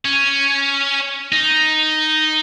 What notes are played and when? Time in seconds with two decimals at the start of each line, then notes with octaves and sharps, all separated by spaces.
0.05 C#4
1.32 D#4